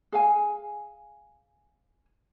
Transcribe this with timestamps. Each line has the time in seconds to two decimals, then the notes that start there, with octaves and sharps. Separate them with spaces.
0.12 G#4 F5 G#5